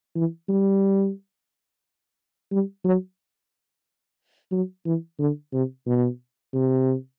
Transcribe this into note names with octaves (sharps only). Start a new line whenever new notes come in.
E3
G3
G3
F#3
F#3
E3
D3
C3
B2
C3